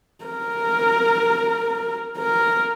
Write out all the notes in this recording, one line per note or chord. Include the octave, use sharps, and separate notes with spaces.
A#4
A#4